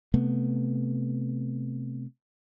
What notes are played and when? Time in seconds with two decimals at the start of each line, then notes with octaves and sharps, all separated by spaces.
0.14 C3 A3 B3